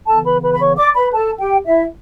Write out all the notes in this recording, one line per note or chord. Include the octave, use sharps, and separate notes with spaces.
C#3 E3 B3 A4 A5
B4 B5
B4 B5
B5
C#5 C#6
D5 D6
B4 B5
A4 A5
G4 G5
E4 E5